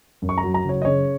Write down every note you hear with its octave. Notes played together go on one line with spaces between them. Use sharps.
F#2
C#6
A#5
F#3
A#5
F#1 C#5
D#5
C#3 C#5